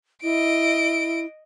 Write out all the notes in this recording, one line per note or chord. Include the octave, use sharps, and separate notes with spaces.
E4 D#5 D7